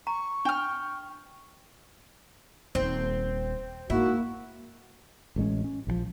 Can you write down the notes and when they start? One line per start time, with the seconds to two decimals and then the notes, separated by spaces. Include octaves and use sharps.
0.07 A#5 C#6
0.45 D4 G5 F6
2.75 D#1 C4
3.90 G#2 A#3 E4 F#4
5.36 A1 A2 G#3 C#4
5.64 C#4
5.87 A#1 C#3 F3